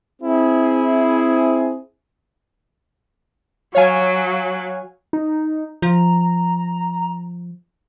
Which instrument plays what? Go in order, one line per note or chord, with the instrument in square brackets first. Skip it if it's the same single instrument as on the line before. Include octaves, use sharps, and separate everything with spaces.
[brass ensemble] C4 E4 G#4
[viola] F#3 [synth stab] C#5 F5 G#5
[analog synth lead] D#4
[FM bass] F3 [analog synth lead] A#5